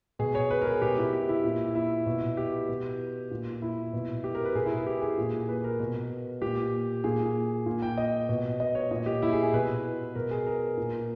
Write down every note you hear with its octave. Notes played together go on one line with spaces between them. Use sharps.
B2 G#4
C#5
B4
A#4
G#4
B2 G4
E4
G4
E4
A#2
E4
B2
G4
B2
A#2
E4
B2
G4
A#4
B4
B2 G#4
E4
G#4
G4
G#4
A#2
B4
A#4
B2
A#2 G4
A#2 G#4
A#2
G5
D#5
B2
D#5
C#5
A#2 D#5
G4
E4
G#4
G#4
B2 B4
B2 A#4
G#4
A#4
A#2